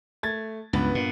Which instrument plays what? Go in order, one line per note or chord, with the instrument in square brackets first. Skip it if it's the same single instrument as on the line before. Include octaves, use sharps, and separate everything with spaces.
[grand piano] A3 G#6 A6
[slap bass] C#2 [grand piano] G2 B3 B5
[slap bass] A#2